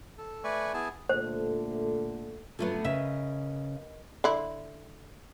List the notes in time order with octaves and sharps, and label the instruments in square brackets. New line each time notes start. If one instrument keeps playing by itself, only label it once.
[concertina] A4
A3 B4 D5 G#5 C#6
B3 E4 G#4 G#5 A5
[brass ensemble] A#2 D3 A3 [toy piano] C5
[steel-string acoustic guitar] F#2 F#3 F4 [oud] D3 A3 B3
[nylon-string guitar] C#3 [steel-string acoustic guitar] A#4 B4 D#5 [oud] E5
[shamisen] D3 E4